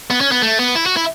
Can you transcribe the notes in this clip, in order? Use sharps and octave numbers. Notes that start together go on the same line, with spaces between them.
B3
C#4
B3
A3
B3
E4
F#4
E4